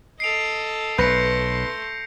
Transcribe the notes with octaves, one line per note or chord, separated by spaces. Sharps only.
A4 D#5 C7 D7 F7
B1 A3 B4 C6 G6 A#6 C#7